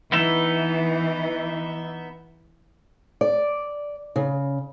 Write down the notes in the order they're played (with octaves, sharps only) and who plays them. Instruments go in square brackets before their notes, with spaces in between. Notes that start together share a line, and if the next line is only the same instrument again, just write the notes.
[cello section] E3 [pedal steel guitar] B3 D#4 E5
[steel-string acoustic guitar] D5
C#3